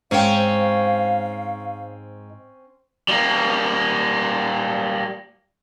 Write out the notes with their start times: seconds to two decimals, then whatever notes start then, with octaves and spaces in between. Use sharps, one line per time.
0.11 G#2 C4 C#4 F5 G5
3.08 G3 A#3